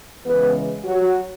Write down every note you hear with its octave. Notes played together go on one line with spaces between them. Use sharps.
C#3 E3 G#3 B3 B4
F#3 F#4